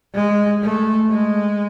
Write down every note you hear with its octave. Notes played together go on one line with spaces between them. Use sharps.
G#3
A3
G#3